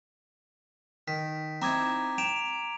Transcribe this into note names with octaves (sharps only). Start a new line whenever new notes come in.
D#3 B6
C4 D#4 E4 A#5 D6 G#6
G5 D7 E7 F7